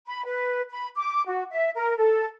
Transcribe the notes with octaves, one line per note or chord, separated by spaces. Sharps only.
B5
B4
B5
D6
F#4
E5
A#4
A4